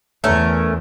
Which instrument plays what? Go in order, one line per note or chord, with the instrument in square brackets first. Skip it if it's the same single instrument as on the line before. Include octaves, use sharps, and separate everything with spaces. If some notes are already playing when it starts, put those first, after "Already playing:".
[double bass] E2 [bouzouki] A3 C#4 A#4